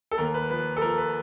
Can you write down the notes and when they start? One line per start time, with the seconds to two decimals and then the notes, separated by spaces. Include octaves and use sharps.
0.11 A4
0.18 D#2 A#4
0.34 B4
0.50 F3 B4
0.77 A4
0.82 F3 A#4
0.98 B4